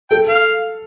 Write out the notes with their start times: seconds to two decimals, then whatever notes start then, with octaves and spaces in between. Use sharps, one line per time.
0.10 A4 G5
0.29 F5